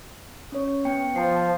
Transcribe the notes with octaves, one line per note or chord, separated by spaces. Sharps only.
C#4 C#5
B3 G5 C#7
F3 A5 C7